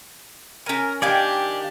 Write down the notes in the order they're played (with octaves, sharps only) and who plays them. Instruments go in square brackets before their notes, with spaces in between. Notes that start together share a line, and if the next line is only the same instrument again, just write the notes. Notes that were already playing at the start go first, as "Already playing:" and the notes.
[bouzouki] C#4 G#5 [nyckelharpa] A#4
[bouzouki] D#3 F5 G5 [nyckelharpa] D4 G4 [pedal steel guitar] D5 G#5